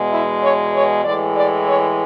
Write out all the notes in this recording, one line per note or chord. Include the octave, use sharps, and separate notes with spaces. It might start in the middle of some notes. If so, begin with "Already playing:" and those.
Already playing: E2 B2 G#3
E4
C#5
C#5
A2 E3 G#3 D5
D5
C#5